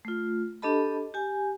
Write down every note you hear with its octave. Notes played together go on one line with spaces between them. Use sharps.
A3 F4
D4 G4 A4 D#5 A5 B5
G4 G#5